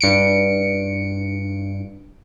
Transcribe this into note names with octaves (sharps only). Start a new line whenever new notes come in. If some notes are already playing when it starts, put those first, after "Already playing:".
G2 C#7 D7